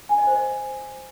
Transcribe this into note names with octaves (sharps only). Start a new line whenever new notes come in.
G#5
D#5
C5
D#5